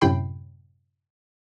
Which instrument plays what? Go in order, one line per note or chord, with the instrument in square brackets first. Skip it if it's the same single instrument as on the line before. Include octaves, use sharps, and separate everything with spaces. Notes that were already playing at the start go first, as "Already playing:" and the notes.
[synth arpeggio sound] F#2 A2 C3 G5 B5 C7